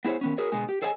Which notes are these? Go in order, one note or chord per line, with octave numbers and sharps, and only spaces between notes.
B3 E4 G#4 C5 C#5
D#3 B3 C#4
F#4 G#4 A#4 B4 C#5
B2 D3 G#3 B3 G#5
G4
G#4 A4 C#5 D#5 F5 G#5